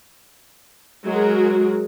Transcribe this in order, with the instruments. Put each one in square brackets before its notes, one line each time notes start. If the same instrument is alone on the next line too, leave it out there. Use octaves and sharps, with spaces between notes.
[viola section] F#3 G#3 F#4 G#4 A#4